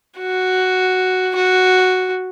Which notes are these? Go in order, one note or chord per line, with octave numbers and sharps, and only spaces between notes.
F#4
F#4